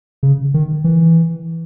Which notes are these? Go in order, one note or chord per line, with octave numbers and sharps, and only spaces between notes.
C#3
D#3
E3